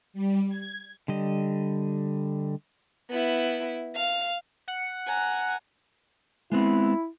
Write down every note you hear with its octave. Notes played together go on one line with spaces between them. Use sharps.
G3
G#6
D3 G3 D#5
B3 E4
F5
F#5
G#5 A#5
G#3 B3 C4 E4